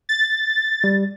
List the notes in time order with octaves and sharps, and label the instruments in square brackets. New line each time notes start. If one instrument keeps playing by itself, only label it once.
[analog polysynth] A6
[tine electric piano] G3